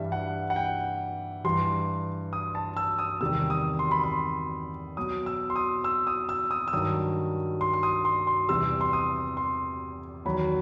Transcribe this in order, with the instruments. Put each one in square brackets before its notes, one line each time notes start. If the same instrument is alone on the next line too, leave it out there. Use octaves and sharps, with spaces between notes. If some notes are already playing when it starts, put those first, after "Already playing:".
Already playing: [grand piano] G2 E3 G3 E5
F#5
F#5
G5
G2 E3 G3 C6
D#6
A5
E6
D#6
E2 C3 D#3 G3 E6
D#6
C6
B5
C6
B2 F#3 D#6
E6
C6
D#6
E6
D#6
E6
D#6
E6
G2 D#3 F#3 D#6
C6
C6
D#6
C6
C6
E2 C3 E3 G3 E6
C6
D#6
C6
E2 D#3 F#3 B5